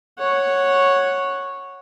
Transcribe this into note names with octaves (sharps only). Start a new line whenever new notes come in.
C#5 F#5